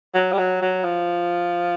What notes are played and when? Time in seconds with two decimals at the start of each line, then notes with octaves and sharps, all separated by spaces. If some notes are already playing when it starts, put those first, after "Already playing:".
0.14 F#3
0.33 G3
0.38 F#3
0.62 F#3
0.84 F3